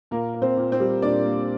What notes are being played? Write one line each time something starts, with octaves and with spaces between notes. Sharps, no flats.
A#2 A#3 A#4
A#3
C4 C5
A#2
C4 C5
G3
A#2 D4 D5
A#3